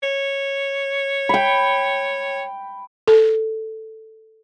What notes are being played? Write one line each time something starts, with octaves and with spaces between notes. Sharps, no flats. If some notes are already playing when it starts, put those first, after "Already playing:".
C#5
G5 B5
A4